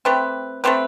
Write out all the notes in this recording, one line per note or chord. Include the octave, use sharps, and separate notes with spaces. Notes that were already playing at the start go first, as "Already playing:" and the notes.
A3 C4 G4 B4
A3 C4 G4 B4